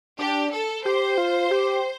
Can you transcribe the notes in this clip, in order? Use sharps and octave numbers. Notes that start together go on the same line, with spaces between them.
D4 G4
A4
G4 C5
F4
G4